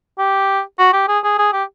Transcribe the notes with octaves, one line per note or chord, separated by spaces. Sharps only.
G4
F#4
G4
G#4
G#4
G#4
G4